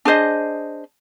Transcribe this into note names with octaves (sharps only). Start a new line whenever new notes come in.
D4 G#4 C5 D#5